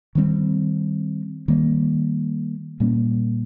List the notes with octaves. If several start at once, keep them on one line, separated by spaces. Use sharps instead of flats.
D#3 G3 C4
D#3 G3 A#3
A#2 G3 A#3 C#4